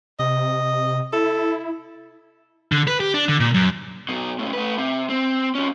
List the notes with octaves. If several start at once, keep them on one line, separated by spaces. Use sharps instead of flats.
C3 D#5
E4 A4
D3
B4
G4
D4
D3
A#2
F#2
B2 F#3
A2 C#3
A3 B4
C3
C4
F3 C#4